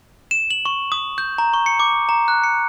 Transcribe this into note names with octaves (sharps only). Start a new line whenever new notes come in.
E7
F#7
C#6
D#6
G6
A#5
C#6
C#7
D6
A#5
F#6
C#7